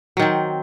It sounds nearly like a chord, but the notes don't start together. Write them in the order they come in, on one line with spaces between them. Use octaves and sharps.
F#3 D#3 C4